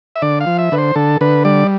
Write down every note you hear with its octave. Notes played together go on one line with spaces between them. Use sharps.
E5
D3 D5
F5
F3
E5
D3 B4
C5
D3 A4
D3 B4
G3 D5